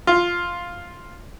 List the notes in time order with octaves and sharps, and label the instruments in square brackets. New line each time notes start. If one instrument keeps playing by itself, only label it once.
[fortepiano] F4